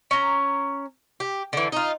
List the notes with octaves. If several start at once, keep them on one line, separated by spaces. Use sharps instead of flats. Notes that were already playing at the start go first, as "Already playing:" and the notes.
C#4 A#5
G4
D3 E3
D#4 F4